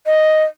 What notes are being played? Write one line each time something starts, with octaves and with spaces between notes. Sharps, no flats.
D#5